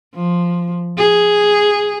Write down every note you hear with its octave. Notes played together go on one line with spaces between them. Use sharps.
F3
G#4